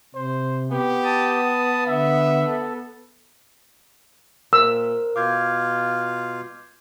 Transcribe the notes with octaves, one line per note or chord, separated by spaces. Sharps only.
C3 C5
B3 G4
A5 D#6
D3 E5
A4
A#2 A#4 C5 E6 F6
B2 F4 F5 D6 G6 G#6